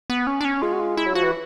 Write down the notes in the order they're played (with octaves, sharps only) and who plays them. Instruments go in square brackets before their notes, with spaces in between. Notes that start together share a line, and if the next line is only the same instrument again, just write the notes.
[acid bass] B3
C#4
D4
C#4
[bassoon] G#3 [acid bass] F4
[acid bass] F#4
F4
E4
[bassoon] F#3
[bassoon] F3 [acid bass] F#4
[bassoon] E3